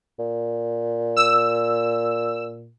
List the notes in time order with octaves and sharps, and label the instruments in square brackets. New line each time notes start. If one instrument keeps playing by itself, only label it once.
[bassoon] A#2
[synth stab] E6